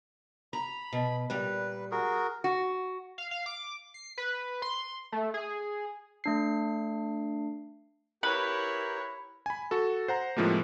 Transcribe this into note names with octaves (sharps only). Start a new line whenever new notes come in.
A#5 B5
B2
A#2 G3 B4
F#4 G#4 A#4
F#4
F5
F5
D6
C7
B4
C6
A3
G#4
A3 D4 C7
E4 G4 A#4 B4 C#5
G#5 B5
F#4 A4
C5 F#5 A#5
A2 C3 F3 G#3 A#3